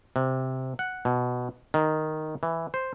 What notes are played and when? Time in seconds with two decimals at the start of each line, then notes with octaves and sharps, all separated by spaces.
0.16 C3
0.79 F#5
1.05 B2
1.74 D#3
2.43 E3
2.74 C5